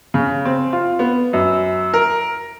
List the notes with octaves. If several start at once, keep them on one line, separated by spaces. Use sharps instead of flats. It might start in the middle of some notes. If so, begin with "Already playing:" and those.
C#3
C4
F4
B3
F#2
A#4